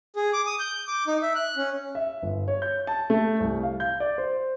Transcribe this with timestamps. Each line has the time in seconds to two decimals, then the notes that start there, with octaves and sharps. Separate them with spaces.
0.16 G#4
0.33 D6
0.46 D#6
0.59 G6
0.88 D6
1.07 D#4
1.22 E5
1.35 F#6
1.57 C#4
1.95 E5
2.22 G1
2.48 C#5
2.62 G6
2.87 A5
3.10 A3
3.40 C2
3.63 F5
3.80 G6
4.00 D5
4.18 C5